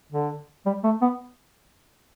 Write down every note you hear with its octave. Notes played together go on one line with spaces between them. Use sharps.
D3
G3
A3
B3